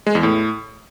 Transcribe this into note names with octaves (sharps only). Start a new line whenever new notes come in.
G#3
E2
A2